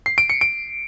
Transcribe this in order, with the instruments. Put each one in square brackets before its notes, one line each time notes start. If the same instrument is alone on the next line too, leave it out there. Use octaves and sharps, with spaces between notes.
[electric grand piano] C7
D7
C#7
D7